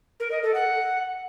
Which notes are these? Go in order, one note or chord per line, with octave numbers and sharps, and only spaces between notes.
A#4
D#5
A4
F#5